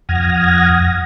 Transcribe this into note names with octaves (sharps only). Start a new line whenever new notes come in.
F2 F#5 D#6 F6 G#6 A#6